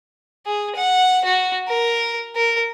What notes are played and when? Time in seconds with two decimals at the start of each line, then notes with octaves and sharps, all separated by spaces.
0.46 G#4
0.75 F#5
1.25 F#4
1.68 A#4
2.35 A#4